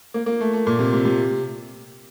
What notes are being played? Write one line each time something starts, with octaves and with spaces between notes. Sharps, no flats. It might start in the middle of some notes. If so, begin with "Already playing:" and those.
A#3
A#3
A3
A3
A#2
C3
C3
C3